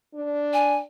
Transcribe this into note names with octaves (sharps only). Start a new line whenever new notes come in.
D4
G#5